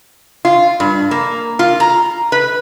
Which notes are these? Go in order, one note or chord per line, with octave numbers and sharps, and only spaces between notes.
F4
G2
A#3
F4
A#5
B4